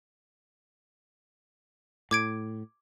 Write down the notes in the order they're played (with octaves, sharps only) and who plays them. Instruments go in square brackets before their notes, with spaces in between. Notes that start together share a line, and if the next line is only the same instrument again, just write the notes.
[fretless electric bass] A2 [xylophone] D6 G#6 D7